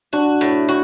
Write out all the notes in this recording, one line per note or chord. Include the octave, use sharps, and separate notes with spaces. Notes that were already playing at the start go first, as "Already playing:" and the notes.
D4 F#4
A2
F#4